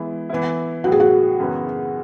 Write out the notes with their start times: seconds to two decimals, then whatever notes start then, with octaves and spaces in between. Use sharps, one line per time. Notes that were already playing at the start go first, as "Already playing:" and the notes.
Already playing: E3 G#3 B3 E4
0.29 E3 B3 E4
0.84 A2 F#3 B3 F#4
0.92 G#4
1.00 F#4
1.39 F#2 C#3 E3 B3